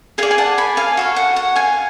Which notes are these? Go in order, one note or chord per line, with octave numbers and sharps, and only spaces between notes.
G#4 D5 F5 G#5
G#5
F#5 A5
G#5 B5
F5 G#5
F#4 A4 C#5 F5
F#5
F#5
F5 G#5